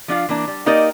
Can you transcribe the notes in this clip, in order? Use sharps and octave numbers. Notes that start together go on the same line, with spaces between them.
F3 D4 F4 F5
E3 A#3 D4
G3
A#3 D#4 G4 A#4 D5 D#5